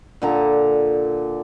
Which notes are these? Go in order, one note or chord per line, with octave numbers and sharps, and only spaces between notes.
A#2 D3 A#5